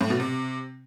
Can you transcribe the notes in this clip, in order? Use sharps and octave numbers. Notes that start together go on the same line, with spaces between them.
A2
B2
C3